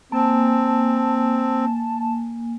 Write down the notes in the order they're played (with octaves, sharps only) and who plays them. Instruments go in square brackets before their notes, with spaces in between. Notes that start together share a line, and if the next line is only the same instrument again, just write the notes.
[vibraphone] A#3 G#5 [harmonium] C4 [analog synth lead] A5